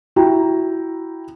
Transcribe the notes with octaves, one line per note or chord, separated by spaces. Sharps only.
E4 F#4 G5 A#5